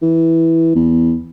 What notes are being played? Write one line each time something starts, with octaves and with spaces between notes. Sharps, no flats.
E3
E2